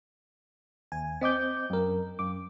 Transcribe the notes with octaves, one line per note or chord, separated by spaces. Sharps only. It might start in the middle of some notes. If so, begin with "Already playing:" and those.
D#2 G#5
C4 D#5 D6 G6
F#2 A#4
F#2 D6